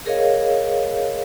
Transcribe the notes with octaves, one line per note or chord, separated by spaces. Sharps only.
G#4 A#4 C#5 D#5 F5